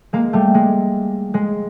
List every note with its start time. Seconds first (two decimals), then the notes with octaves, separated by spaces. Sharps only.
0.13 G#3 A#3
0.33 G3 A3
0.54 G#3
1.34 G#3